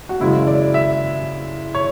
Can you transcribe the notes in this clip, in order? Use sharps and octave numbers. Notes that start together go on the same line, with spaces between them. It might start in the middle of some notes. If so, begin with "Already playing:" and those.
F#4
F#2 C#3 E3 G#3 E4
D5
E5
C#5